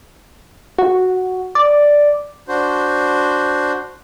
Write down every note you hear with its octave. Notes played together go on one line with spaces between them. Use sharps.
F#4
D5
D4 F#4 C5